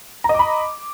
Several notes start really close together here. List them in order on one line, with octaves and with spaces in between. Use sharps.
A#5 D#5 D6 B5